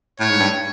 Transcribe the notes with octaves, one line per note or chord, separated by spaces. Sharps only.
A2 C#5
G#2
G2